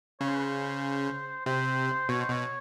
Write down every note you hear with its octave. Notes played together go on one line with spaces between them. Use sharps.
C#3 C#5
C5
B4
C5
C3 C5
B2 C#5
C5
B2 C#5